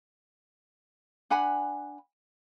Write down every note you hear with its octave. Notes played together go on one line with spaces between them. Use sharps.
D4 F#5 G#5 B5